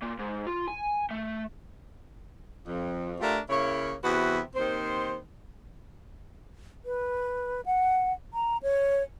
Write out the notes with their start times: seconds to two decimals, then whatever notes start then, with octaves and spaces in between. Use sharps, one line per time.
0.02 A#2
0.19 G#2
0.47 F4
0.68 G#5
1.11 A3
2.67 F2
3.20 A3 D4 F4 G4 A#4
3.50 C#3 A#3 E4 C#5
4.04 E2 C3 F#4 B4 E5
4.56 D#2 D#3 C4 C5
6.85 B4
7.66 F#5
8.34 A#5
8.63 C#5